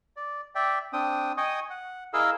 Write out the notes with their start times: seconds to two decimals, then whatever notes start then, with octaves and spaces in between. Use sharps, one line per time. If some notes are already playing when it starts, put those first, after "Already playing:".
0.16 D5
0.55 D5 E5 G5
0.93 C4 D4 G5 D#6
1.37 D#5 G5 G#5 C#6 D#6
1.70 F#5
2.13 E4 G#4 A#4 D#5 F5 E6